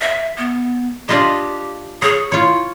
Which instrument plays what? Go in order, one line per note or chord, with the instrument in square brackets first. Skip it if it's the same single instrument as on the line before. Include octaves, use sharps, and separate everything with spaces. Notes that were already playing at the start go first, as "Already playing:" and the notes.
[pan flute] E5
B3
[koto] D4 F4 D#5 [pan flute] G4
[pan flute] G#4 [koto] C#5
[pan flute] E4 [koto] F4 C#5